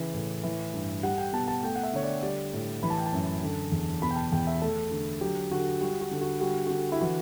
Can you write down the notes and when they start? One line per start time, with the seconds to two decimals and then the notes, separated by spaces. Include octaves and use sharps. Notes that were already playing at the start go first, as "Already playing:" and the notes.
Already playing: C#3 E3
0.14 A2
0.43 E3
0.74 G2
1.03 G3 F#5
1.18 G5
1.33 B2 A5
1.48 A5
1.63 A3 G5
1.75 F#5
1.83 E5
1.93 D3 C#5
2.03 D5
2.23 G3 D5
2.53 A2
2.83 E3 B5
2.90 A5
2.98 G5
3.06 A5
3.13 F#2
3.42 D3
3.72 E2
4.02 B2 B5
4.11 G5
4.16 A5
4.32 E2 G5
4.47 E5
4.61 A3 A4
4.91 D3
5.21 F#3 G4
5.51 D3 F#4
5.81 G3 F#4
6.01 F#4
6.11 D3
6.21 F#4
6.41 G3 F#4
6.67 F#4
6.70 D3 G4
6.92 E4
7.01 E3 F#4